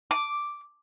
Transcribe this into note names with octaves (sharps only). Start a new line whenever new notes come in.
D6